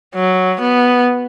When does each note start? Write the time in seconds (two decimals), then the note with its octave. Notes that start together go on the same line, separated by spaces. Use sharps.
0.15 F#3
0.61 B3